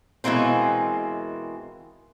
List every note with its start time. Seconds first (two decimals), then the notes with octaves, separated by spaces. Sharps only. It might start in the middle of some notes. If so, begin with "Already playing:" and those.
0.24 B2 E3 G#3 A#3 C4